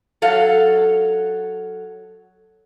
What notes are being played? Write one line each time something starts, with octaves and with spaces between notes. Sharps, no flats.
F#3 A4 F5